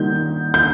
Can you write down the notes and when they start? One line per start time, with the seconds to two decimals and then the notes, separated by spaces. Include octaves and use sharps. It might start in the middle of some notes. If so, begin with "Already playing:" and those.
Already playing: D#3 G3 A#3 D#4 G6
0.54 G6